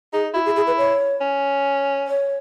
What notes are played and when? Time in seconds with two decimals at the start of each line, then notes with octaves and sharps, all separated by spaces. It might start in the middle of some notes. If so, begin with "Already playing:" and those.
0.13 D#4 G#4
0.34 E4 F#4
0.45 G#4
0.56 G#4
0.67 B4
0.77 C#5
1.21 C#4
2.08 C#5